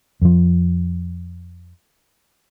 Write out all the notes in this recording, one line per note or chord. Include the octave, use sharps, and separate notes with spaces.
F2 F3